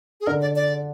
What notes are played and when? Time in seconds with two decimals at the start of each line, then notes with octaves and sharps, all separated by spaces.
0.21 G#4
0.27 D3 D4 A#4
0.41 D5
0.56 D5